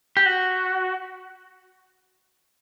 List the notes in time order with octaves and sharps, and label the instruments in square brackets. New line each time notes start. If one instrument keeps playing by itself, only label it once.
[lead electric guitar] G4
F#4